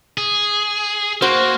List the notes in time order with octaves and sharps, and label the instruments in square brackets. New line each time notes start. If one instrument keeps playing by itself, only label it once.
[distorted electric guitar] G#4
[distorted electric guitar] A#3 [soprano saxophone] F#4 [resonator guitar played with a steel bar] C5